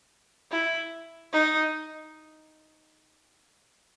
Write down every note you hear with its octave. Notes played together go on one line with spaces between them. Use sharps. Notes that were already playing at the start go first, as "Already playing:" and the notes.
E4
D#4